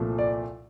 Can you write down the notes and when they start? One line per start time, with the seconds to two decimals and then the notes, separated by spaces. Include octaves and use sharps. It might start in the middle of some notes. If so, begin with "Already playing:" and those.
Already playing: C2 A#2 F3 A3
0.18 D5